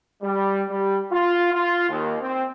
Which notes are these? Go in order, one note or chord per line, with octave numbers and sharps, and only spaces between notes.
G3
G3
F4
F4
D#2
C4